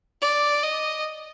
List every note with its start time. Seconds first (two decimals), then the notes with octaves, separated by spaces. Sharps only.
0.22 D5
0.63 D#5